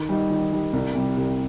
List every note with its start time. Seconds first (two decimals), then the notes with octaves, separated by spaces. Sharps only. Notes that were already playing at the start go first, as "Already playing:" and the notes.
Already playing: D#3
0.09 G3 D#4
0.30 D#3
0.52 G3 D#4
0.73 C2
0.95 C3 G3
1.17 C2